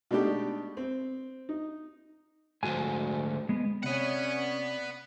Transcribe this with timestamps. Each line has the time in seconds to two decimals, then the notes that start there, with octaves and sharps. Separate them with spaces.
0.11 B2 G#3 A3 D4 D#4 G4
0.77 C4
1.49 D#4
2.63 D2 G#2 F#4 G#5
3.49 G#3 B3
3.83 C3 C#4 B4 D5 F#5